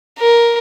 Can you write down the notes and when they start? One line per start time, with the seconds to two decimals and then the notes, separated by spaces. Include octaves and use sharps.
0.19 A#4